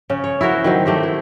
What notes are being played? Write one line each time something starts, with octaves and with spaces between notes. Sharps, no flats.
C#3 C#4
C#5
E4 F#4 A#4 C5
D#3 F#3 C4
A3 G4 C5
E4